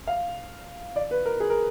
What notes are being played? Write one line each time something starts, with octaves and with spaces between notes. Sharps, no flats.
F5
D5
B4
A#4
G#4
A#4